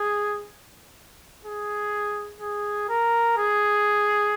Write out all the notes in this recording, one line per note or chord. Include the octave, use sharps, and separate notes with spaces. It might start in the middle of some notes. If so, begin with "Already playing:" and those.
Already playing: G#4
G#4
G#4
A#4
G#4